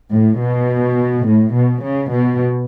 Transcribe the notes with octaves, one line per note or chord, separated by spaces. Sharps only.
A2
B2
A2
B2
C#3
B2